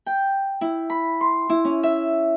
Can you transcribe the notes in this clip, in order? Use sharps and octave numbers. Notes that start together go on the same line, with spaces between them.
G5
E4
B5
C6
E4
C#4
E5